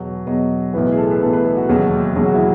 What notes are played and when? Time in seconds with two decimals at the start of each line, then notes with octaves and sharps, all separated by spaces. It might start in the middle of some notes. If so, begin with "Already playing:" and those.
Already playing: E2 B2 F#3
0.27 E2 B2 F#3 D#5
0.74 B1 A2 E3 B4
0.92 G#4
0.97 A4
1.11 B4
1.21 B1 A2 E3 A4
1.33 B4
1.45 A4
1.57 F#4
1.69 E1 D#2 C#3 F#3
2.16 E1 D#2 C#3 F#3 G#4
2.26 F#4
2.35 E4